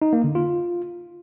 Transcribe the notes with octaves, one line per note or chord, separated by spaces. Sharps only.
D#4
A#3
D3
F4